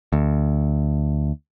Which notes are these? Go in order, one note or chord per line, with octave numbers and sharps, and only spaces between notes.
D2